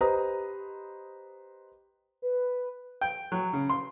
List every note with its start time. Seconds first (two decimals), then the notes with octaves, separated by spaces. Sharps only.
0.01 G4 B4 C5 D#5 A#5 D#6
2.22 B4
3.01 G5
3.32 F#3
3.53 C#3
3.70 C6